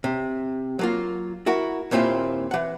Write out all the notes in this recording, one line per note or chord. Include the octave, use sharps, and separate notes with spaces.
C3
F#3 A#3 F4
E4 F#4 A#4
D#2 A#2 C4 E4 F4
E3 F#5